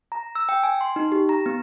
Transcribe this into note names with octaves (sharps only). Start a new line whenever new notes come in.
A#5
E6
G5
G#5
C6
D#4
G4
A#5
B3